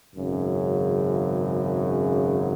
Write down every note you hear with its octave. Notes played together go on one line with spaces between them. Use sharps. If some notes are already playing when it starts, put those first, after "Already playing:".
G#1 F#2 C#3